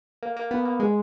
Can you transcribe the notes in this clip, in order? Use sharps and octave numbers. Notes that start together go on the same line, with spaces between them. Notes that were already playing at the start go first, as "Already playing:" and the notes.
A#3
A#3
B3
A#3
G#3